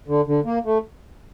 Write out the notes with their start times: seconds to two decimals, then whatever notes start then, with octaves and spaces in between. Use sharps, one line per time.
0.08 D3
0.27 D3
0.45 A#3
0.65 A3